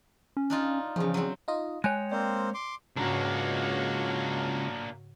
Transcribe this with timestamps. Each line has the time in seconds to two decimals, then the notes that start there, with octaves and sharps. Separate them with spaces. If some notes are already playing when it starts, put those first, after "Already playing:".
0.37 C#4
0.50 D4 D#4 F4
0.96 E2 C#3 F3
1.14 F#3 C4
1.48 D#4 F4 D#5
1.84 G#3 C#5 G5 G#5 F#6
2.12 A#3 C4 C5 D5
2.54 C6 D6
2.97 C#2 G#2 C#3 A#3 D4 F#4 C#5 A#5